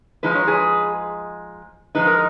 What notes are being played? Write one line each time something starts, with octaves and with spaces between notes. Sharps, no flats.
F3 G#3 D#4 B4
C#5
G#4 B4
F3 G#3 D#4 B4
A#4